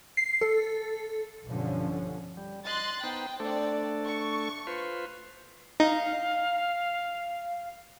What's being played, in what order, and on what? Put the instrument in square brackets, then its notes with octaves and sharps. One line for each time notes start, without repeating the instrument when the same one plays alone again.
[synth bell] C7
A4
[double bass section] B1 G2 D3 F3 C#4
[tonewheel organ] G3
[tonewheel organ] D#5 [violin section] C6 F#6 A6
[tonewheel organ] B3 D#4 C5 [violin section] G5
[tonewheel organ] A3 D4 A4 [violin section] C4 D5
[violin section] C#6
[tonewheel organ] F4 B4 C5
[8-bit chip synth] D#4 [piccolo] F5